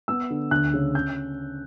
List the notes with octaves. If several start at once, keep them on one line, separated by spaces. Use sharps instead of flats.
B3 E6
D3
D2 F#6
C#3
C#4 G6